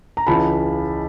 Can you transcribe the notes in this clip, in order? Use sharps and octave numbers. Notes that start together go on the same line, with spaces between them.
A#5
C#2 C#3 E3 A5 B5